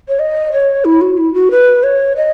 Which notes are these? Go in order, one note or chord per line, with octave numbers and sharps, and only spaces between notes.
C#5
D#5
C#5
E4
F#4
E4
F#4
B4
C#5
D#5